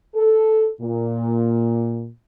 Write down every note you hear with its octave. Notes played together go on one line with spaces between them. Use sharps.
A4
A#2